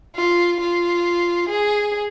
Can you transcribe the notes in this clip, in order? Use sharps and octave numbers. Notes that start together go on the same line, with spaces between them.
F4
F4
G#4